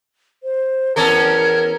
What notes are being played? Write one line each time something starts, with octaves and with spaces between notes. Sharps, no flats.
C5
E2 C#4 A4 A#4 G#6